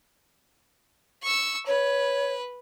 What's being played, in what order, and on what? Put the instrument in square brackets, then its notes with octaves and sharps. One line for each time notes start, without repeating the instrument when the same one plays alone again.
[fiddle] C#6 E6
[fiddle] B4 [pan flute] C#5